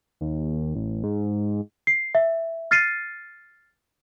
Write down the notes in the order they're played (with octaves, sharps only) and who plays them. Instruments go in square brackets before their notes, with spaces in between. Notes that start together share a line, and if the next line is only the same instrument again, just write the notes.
[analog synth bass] D#2
A1
G#2
[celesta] C7
E5
F6 A6 C7 C#7 D#7